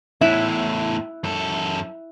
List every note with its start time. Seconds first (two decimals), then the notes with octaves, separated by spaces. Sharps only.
0.21 E2 A2 E4 E5 F#6
1.24 F#2 A4